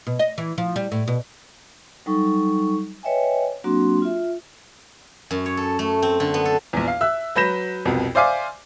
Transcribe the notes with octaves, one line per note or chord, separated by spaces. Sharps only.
B2
D#5
E3
F3
G3
A2
B2
F#3 G3 D#4 A4 C#6
B4 C#5 D#5 E5 G5 G#5
F#3 A#3 C4 D4 F#4 C6
F4 E5
F#2
C#5
A4
A3
C4
D3
B3
A4
A#1 E2
F5
E5 E6 F#6
F#3 B4 B5 G6 A#6 E7
C2 F2 B2
C5 D5 E5 F5 G#5 D6